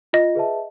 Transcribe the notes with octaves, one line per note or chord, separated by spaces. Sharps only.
F4 D#5
G#4 B4 E5 A5